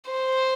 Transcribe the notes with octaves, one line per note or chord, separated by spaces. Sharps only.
C5